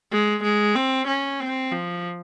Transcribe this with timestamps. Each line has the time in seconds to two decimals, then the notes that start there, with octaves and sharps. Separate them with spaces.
0.12 G#3
0.44 G#3
0.76 C4
1.08 C#4
1.40 C4
1.72 F3